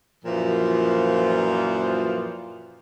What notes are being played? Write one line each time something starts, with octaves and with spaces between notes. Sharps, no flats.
F#2 A#2 E3 F3